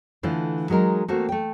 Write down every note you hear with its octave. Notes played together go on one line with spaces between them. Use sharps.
D3 E3 A3 F4
F#3 G#3 D#4 A#4
A3 A#3 C4 F#4
A3 G5